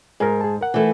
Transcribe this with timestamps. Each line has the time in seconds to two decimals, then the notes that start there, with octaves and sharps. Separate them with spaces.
0.20 G#2 G#4 A#4
0.41 G#4 A5
0.61 A#4 F#5
0.74 E3 A3